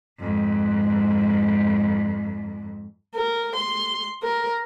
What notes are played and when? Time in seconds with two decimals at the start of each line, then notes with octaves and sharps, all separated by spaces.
0.19 F2 G#2
3.15 A#4
3.57 C6
4.23 A#4